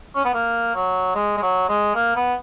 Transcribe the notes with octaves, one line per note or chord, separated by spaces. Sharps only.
C#4
B3
A#3
F#3
G#3
G#3
F#3
G#3
A#3
B3